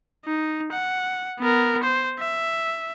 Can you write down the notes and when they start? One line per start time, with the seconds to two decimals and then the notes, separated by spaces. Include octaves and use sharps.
0.26 D#4
0.73 F#5
1.39 B3 A#4
1.83 C5
2.19 E5